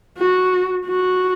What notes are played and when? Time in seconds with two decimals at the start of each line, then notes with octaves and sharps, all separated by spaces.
0.18 F#4
0.86 F#4